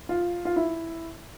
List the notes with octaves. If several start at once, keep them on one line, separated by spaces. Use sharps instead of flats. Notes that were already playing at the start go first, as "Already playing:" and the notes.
F4
F4
E4